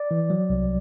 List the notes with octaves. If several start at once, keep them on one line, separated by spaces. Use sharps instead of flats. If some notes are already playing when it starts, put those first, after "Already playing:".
Already playing: D5
E3
F#3
C2